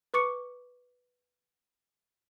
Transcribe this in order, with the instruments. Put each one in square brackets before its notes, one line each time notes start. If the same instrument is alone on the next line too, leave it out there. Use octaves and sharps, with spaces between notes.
[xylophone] B4 C#6 D6 C#7